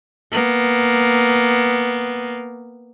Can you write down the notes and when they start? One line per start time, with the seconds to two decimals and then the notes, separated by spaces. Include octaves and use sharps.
0.32 A#3 B3